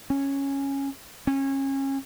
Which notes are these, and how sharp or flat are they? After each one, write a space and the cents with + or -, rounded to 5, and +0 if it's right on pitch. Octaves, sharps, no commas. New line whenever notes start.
C#4 -5
C#4 -30